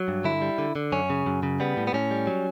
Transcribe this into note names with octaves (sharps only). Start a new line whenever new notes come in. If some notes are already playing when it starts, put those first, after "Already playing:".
Already playing: F#3
G2
D3 E4
G3
D3
D3
F#2 C#4
C#3
F#2
C#3
G3 B3
A2
B3
A2 C#4
G3
F#3